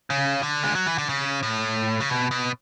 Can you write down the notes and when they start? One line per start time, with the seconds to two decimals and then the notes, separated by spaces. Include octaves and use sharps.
0.10 C#3
0.43 D3
0.64 G#3
0.75 F#3
0.87 E3
0.98 D3
1.09 C#3
1.43 A2
2.00 C#3
2.10 B2
2.31 B2